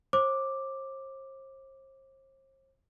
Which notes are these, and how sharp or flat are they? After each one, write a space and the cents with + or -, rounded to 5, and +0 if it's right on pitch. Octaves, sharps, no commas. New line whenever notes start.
C5 +40 D6 +5